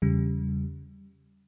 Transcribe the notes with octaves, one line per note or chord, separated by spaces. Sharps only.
E2 C#3 G3